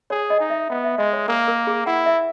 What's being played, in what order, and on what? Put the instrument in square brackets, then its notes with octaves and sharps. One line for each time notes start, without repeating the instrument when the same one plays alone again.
[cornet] G#4 [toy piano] C#5
[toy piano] D#5
[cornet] D#4
[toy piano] E5
[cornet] B3
[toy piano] E5
[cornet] G#3 [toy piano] D#5
[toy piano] C#5
[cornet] A#3 [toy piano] A#4
[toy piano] A#4
G#4
[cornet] E4 [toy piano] F#5
[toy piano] E5